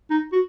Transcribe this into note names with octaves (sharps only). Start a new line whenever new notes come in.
D#4
F#4